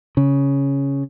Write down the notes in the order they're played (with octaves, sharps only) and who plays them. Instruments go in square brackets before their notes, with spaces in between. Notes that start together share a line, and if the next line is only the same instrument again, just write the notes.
[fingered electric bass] C#3